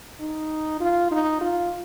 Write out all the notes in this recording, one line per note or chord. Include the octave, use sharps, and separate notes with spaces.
D#4
F4
D#4
F4